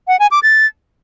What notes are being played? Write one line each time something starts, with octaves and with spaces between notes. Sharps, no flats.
F#5
G#5
D6
A6